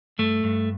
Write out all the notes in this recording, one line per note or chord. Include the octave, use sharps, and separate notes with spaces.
G2 A3
G2